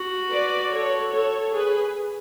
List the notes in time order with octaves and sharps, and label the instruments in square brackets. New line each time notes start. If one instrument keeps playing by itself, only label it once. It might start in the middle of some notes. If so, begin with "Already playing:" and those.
Already playing: [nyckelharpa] F#4
[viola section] B4 D5
A4 C#5
A4 C#5
G#4 B4